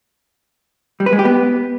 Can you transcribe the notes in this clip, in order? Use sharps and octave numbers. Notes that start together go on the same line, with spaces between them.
G3
B4
G#3
G4
B3